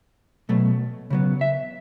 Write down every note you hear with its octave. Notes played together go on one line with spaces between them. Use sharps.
B2 F#3 A3
C#3 F#3 B3
E5